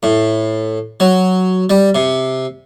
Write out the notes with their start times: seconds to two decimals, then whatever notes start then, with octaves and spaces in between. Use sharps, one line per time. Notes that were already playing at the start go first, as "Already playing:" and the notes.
0.03 A2
1.00 F#3
1.70 G3
1.95 C3